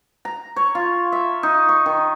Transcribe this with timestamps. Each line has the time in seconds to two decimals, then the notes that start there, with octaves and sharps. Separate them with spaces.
0.25 A#5
0.56 C#5
0.75 F4
1.12 E5
1.43 D#4
1.69 C#6
1.86 D#3